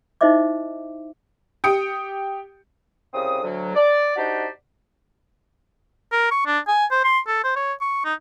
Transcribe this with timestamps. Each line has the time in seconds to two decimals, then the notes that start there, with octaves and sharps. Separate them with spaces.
0.21 D#4 E4 C5 D#5 E5 D6
1.64 G4 G5 D#6 C#7 D7
3.13 C2 C#3 C4 D#6
3.43 D2 F#3
3.75 D5
4.16 D4 D#4 F#4 G4 C5 D5
6.12 A#4
6.31 C#6
6.46 D4
6.67 G#5
6.91 C5
7.05 C6
7.27 A4
7.44 C5
7.56 C#5
7.81 C#6
8.05 D#4